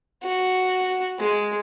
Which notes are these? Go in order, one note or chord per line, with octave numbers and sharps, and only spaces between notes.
F#4
G#3